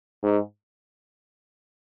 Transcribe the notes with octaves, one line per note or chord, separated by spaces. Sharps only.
G#2